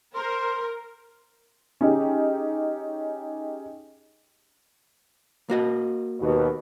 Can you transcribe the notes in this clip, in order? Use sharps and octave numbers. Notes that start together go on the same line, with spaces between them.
A#4 C5 C6
C#4 D#4 G4 G#4
A#3 F#4 D#5
D#2 B2